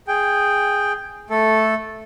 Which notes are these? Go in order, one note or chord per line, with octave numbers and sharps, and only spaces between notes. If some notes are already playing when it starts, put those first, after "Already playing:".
G#4 G5
A3 A4